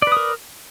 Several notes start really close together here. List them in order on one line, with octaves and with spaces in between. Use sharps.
D5 B4 D#6 A#4